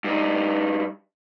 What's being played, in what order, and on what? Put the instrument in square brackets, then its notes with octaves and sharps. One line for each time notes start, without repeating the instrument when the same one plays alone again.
[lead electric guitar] G2 D#4